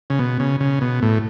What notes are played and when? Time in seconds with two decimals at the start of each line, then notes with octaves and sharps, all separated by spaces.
0.10 C#3
0.19 B2
0.40 C#3
0.60 C#3
0.81 B2
1.02 A2